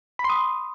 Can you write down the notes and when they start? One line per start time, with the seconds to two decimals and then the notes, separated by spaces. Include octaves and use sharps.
0.19 B5
0.24 C6
0.29 D#6